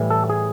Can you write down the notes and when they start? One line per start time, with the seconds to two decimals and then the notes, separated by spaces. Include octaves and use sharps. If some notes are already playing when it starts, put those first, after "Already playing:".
Already playing: A2 E3 G3
0.10 A4
0.29 G#4